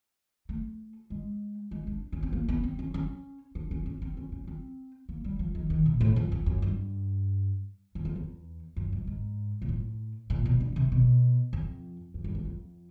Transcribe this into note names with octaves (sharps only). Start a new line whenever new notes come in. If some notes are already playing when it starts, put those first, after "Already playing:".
A3
G#3
G#3
D4
C#4
C4
A#3
B3
C4
C#4
C#4
D4
C#4
C#4
C4
C#4
C#4
C4
A#3
G3
F3
D#3
D#3
A#2
A2
F2
F2
F#2
G2
F#2
F2
E2
F#2
G#2
G#2
A#2
A2
A#2
B2
D3
C3
B2
F2
F#2
G2
F#2
F2